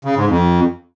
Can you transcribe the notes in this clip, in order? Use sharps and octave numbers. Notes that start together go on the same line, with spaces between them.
C#3
G#2
F2